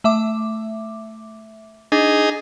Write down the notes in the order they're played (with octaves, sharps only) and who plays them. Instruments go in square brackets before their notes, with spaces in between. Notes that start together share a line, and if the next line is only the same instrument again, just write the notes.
[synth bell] A3 E5 D6
[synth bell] D4 [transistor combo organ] D#4 G#4